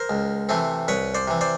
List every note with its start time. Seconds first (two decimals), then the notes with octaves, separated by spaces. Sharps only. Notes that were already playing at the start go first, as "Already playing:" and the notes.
Already playing: A#4 C5
0.10 C#2
0.49 C3 E3 A3 C4
0.88 C2 B4 C#5
1.15 C5 D5
1.28 C3 E3
1.41 C5 D5